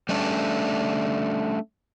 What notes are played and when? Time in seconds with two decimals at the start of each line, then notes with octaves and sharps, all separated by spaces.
0.09 G3 A3 C#4 D4